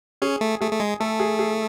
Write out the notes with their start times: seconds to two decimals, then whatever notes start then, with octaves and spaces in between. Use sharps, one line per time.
0.22 C#4 G#4
0.41 A3
0.61 A3 G#4
0.72 A3
0.80 G#3
1.00 A3 A4
1.20 G#4
1.39 G#4